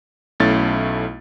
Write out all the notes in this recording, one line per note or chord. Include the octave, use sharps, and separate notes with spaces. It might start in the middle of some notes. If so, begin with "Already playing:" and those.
B1 A3 C#4 E4 A6